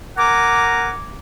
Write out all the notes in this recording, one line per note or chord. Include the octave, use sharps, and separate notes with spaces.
A#4 F#5 G#5 A#5 D6